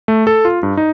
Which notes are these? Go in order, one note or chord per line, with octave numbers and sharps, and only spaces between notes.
A3
A4
F4
G2
D#4